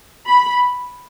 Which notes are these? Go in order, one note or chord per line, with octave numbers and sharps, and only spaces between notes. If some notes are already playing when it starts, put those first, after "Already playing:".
B5